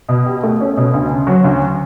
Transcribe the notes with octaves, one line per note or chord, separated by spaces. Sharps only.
B2
G4
A3
C#4
B2
D2
C#3
F#3
D2